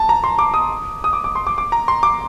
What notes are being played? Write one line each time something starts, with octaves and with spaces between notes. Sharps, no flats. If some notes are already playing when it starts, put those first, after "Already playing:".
Already playing: A5
A#5
C6
D6
D#6
D#6
D6
D6
C6
D6
D6
A#5
C6
D6